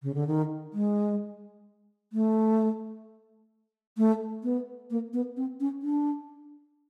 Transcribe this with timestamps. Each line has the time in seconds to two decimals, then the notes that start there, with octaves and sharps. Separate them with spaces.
0.03 C#3
0.14 D3
0.27 D#3
0.74 G#3
2.13 A3
3.97 A3
4.43 B3
4.91 A#3
5.13 B3
5.37 C4
5.60 C#4
5.83 D4